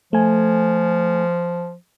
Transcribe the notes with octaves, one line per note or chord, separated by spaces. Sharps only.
F3 A3 G#5